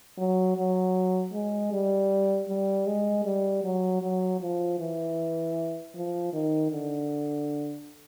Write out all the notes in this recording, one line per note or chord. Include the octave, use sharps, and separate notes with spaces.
F#3
F#3
G#3
G3
G3
G#3
G3
F#3
F#3
F3
E3
F3
D#3
D3